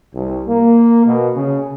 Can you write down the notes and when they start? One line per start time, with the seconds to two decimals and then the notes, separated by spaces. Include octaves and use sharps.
0.15 C2
0.47 A#3
1.06 B2
1.36 C#3